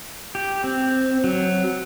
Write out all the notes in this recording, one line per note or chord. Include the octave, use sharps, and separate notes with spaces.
G4
C4
F#3